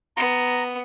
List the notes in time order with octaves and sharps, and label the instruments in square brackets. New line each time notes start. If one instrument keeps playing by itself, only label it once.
[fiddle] B3 [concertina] A#5